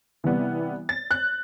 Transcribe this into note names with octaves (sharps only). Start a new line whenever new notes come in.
C3 E3 G3 B3
A6
F#6